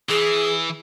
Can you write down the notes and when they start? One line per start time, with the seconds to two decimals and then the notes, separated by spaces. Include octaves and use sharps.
0.09 E3 G#4